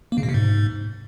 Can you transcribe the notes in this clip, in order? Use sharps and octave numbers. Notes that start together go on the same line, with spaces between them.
A#3
C#3
B2
C3
G#2